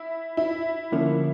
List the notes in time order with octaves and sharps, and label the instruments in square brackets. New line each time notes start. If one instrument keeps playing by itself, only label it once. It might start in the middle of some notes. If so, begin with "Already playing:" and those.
Already playing: [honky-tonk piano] E4
E4
[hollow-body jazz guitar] D3 F3 A#3 C#4